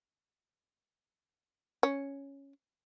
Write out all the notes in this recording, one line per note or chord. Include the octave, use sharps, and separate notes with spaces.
C#4